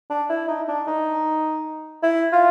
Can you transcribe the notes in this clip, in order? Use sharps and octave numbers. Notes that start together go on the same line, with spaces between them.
D4
E4
D#4
D4
D#4
E4
F4